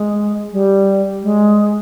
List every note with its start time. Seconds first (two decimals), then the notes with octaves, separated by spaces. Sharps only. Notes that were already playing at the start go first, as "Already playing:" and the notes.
Already playing: G#3
0.53 G3
1.23 G#3